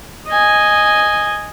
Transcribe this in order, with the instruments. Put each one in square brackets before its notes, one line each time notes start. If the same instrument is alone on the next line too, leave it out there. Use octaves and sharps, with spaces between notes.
[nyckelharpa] D#5 G#5